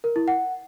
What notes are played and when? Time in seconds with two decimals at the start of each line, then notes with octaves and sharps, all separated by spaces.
0.04 A#4
0.16 E4
0.28 F#5